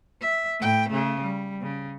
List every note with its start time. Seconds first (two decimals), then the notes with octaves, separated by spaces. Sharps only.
0.21 E5
0.59 A2 G5
0.89 C#3 A3
1.21 G3
1.61 C#3